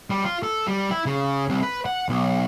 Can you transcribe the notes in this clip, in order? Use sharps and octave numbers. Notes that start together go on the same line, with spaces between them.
G3
F4
A4
G3
E4
C#3
C2
B4
F#5
B1